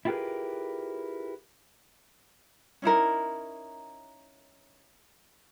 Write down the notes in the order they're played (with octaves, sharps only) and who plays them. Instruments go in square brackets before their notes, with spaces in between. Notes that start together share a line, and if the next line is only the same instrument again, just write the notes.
[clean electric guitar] E4 F4 G4 G#4 A#4 B4
[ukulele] C#4 D#4 E4 A#4